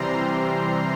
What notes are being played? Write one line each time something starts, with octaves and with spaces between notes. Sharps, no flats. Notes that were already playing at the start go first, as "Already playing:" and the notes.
Already playing: C3 E3 G3 C4 A#5 C6